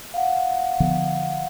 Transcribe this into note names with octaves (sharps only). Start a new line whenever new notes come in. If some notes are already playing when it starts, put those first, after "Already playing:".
F5 F#5
D3 F3 B3